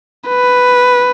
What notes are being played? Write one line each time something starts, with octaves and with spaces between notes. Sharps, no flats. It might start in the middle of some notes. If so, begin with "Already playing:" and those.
B4